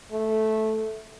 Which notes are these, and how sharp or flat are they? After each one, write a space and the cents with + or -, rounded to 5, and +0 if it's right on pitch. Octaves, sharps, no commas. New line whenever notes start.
A3 -10